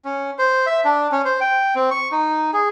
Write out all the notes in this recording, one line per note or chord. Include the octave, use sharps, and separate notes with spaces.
C#4
C5
E5
D4
C#4
C5
G5
C4
C#6
D#4
G#4